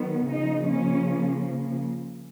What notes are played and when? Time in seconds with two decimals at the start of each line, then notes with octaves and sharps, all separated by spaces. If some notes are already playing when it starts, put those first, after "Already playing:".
Already playing: D#3 F#3 B3
0.31 C#3 F3 A#3 D#4
0.69 C#4